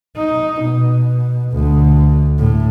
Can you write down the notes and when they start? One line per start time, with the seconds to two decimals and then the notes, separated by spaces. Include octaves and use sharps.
0.17 D#4
0.62 B2
1.53 D2
2.38 A2